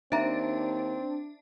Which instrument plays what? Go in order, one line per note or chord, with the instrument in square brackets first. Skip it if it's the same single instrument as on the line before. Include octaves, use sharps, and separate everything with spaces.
[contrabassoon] D#2 [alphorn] C4 [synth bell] D4 [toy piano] C5 E5 A#5